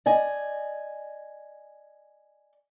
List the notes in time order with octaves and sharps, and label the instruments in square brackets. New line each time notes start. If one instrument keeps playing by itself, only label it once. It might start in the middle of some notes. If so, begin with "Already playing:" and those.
[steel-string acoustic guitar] D5 D#5 G#5